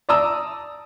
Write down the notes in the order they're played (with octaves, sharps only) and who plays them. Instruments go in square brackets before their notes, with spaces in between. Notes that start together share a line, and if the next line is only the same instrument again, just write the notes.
[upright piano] D5 A5 A#5 D#6 E6